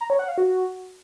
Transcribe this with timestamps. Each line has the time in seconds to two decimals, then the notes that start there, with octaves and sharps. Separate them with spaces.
0.01 A#5
0.10 C#5
0.19 F#5
0.28 F5
0.38 F#4